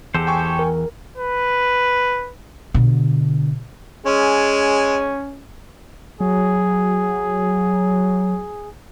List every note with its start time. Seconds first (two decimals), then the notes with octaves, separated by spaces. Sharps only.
0.14 E2 G4 A4 C5
0.27 G5 G#5 C#6
0.59 A#4
1.18 B4
2.74 B2 D3
4.06 G#3 C#4
6.20 F#3 G#4